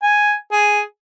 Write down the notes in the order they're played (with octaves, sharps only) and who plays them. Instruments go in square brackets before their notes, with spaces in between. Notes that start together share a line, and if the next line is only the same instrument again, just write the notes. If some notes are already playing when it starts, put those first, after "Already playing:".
[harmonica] G#5
G#4